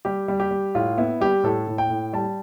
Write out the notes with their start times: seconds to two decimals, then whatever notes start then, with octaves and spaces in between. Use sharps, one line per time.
0.05 G3 G4
0.28 G3
0.40 G4
0.51 G3
0.75 A2 F4
0.98 B3 E4
1.21 G3 G4
1.43 A2 A4
1.67 A2
1.78 G5
1.90 A2
2.13 G3 A5